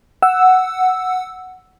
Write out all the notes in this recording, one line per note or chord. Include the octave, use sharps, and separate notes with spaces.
F#5 E6